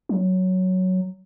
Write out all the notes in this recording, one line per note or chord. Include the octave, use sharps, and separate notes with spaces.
F#3